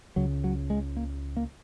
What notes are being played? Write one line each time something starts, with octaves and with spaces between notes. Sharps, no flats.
C#2 C#3 F#3
F#3
G#3
A#3
A#3